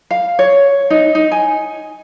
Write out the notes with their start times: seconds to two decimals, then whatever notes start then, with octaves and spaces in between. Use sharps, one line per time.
0.11 F5
0.39 C#5
0.90 D#4
1.15 D#4
1.31 G#5